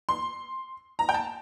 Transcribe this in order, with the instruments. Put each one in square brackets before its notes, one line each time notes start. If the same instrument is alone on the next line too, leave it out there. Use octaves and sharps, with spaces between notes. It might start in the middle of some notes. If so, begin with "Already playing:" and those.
[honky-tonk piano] C6
A#5
G5
A5